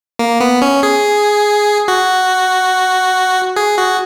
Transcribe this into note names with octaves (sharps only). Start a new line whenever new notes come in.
A#3
B3
C#4
G#4
F#4
G#4
F#4